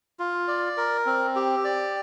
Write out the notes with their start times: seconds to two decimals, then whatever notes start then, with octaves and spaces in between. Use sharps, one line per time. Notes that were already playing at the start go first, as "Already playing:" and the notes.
0.19 F4
0.48 D5
0.77 A#4
1.06 C4
1.35 G4
1.64 D5